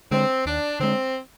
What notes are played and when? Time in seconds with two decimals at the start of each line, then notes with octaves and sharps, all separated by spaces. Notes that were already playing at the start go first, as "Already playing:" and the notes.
0.11 D3 G#3 C4
0.46 D#2 D4
0.79 D3 G#3 C4